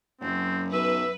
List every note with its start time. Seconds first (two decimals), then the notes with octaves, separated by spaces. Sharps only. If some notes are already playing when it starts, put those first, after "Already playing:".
0.21 F#1 F#2 C4
0.73 B1 B4 E5